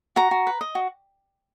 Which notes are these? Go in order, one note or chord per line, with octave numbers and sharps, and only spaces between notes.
F#4 A#5
F#4
B4
D#5
F#4